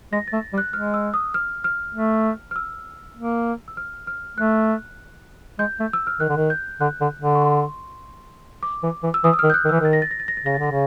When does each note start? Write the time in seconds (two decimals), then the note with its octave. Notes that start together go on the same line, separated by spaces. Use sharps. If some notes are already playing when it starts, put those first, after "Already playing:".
0.12 G#3 A#6
0.28 A6
0.33 A3
0.53 G3
0.58 F#6
0.73 G#3 F6
0.94 E6
1.14 D#6
1.34 F6
1.64 F6
1.94 A3
2.51 F6
2.56 E6
3.17 A#3
3.68 E6
3.77 F6
4.07 F6
4.37 A3 F#6
5.59 G#3 G6
5.80 A3
5.93 E6
6.07 F6
6.20 D#3 F#6
6.29 D3
6.36 D#3
6.50 G6
6.81 D3 F#6
7.01 D3
7.21 D3
7.35 C#6
7.42 C6
8.63 D6
8.83 E3
9.03 E3
9.14 E6
9.24 E3 D#6
9.33 E6
9.39 D#3 F6
9.50 G6
9.54 F#6
9.65 D#3
9.69 E3 E6
9.80 D#3 A6
9.93 A#6
10.02 A6
10.11 A#6
10.20 A6
10.28 A#6
10.37 A6
10.45 C#3 A#6
10.54 A6
10.59 D3 A#6
10.71 C#3